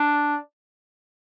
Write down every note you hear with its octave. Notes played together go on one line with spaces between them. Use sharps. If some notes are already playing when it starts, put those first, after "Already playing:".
Already playing: D4